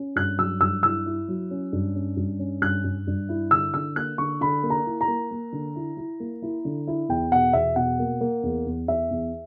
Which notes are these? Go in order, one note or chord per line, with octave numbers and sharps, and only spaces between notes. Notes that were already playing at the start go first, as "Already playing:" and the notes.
Already playing: C#4
G2 F#6
F#3 E6
G2 E6
E4 E6
E4
F#3
C#4
G2
C#4
G2
C#4
G2 F#6
G2
G2
E4
D3 E6
D3 E6
A#3 F#6
D3 C#6
D3 B5
A#3
A#5
E4
A#5
A#3
A#3
D3
E4
E4
A#3
E4
D3
E4
E2 G5
B2 F#5
E2 E5
B2 F#5
A#3
A#3
E2
E2
E2 E5
E2